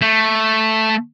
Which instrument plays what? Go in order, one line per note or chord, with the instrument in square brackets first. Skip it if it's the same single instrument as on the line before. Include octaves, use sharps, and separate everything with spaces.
[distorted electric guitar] A3